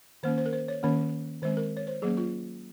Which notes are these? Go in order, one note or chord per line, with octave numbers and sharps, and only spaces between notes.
D#3 A#3 C#4 C5
C5
A#4
C5
C#5
D#3 A#3 C#4 C#5
D#3 G#3 C4 C5
A#4
C#5
C5
F#3 A#3 C#4 G#4
F4